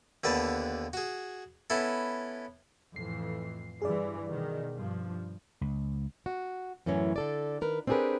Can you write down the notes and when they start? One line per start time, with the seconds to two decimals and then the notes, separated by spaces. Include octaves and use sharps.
0.24 D#2 D3 B3 B4 A5
0.93 F#4 G#4
1.70 B3 C#4 E4 A4
2.96 F2 A2 E3 C7
3.82 G2 E3 G#4 D5
4.31 B2 D#3
4.77 G2 F3
5.61 C#2
6.26 F#4
6.86 F#2 A2 E3 F#3 C#4
7.16 D3 A4 D5
7.61 D#3 A#4 B4
7.87 C4 D4 G4 G#4 A#4 B4